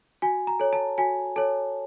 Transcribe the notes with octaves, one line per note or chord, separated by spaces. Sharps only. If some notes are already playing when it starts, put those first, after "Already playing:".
F#4 G#5
A#5
A4 C#5
A5
F#4 G#5
A4 C#5 A5